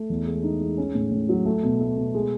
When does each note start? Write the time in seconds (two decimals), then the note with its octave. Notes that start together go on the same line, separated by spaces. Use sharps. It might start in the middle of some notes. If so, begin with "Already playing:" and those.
Already playing: A3
0.10 E2
0.26 G#3
0.43 D#4
0.60 G#3
0.78 C#4
0.95 A2
1.12 A2
1.29 F#3
1.45 A3
1.63 B2
1.80 A3
1.97 B2
2.14 G#3